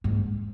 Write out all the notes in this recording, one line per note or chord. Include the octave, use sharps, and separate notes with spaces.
G#2